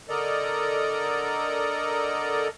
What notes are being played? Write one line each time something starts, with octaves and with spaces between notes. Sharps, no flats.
D3 A4 A#4 D5 D#5 A#5